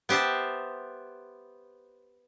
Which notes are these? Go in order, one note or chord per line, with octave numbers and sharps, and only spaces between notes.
B3 G4 C5 E5 A5